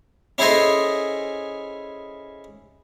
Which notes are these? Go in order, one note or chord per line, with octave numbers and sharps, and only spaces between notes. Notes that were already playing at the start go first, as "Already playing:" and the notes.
C#4 E4 G#4 A4 C5 D#5